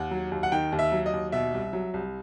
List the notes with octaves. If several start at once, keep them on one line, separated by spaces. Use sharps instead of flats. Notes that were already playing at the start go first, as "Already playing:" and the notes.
Already playing: D#2 F#5
F#3
D#2
F#5
D#3 G5
D#2
E5
F#3
D#5
D#2
B2 E5
C2
F#3
C2